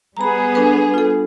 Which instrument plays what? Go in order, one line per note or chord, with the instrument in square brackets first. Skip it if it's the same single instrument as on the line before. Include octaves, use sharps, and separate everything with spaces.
[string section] G3 B3 G#4 [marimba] A#5 B5
[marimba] D4 A4 B4
F4 A4